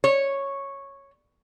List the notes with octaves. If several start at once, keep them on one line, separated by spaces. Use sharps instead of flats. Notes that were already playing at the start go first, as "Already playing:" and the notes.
C#5